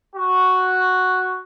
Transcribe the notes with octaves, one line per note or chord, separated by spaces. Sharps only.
F#4